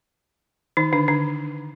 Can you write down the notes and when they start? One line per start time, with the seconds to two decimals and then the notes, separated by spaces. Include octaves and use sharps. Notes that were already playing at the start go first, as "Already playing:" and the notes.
0.77 D#3 D#4
0.92 D3 D4
1.08 D3 D4